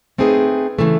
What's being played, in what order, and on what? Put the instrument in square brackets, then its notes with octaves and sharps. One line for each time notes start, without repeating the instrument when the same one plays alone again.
[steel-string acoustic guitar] A3 C4 D#4 G#4 B4
C#3 E3 A3